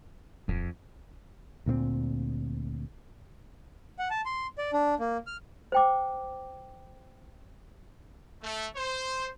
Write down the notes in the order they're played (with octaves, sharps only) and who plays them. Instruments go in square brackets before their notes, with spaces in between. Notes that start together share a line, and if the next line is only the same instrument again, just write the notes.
[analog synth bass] D#1 [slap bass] F2
[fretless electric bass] D2 A#2 A#3 C4
[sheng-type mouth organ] F#5
A5
C6
D5
D4
A#3
F6
[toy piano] C5 G5 D6
[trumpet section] A3
C5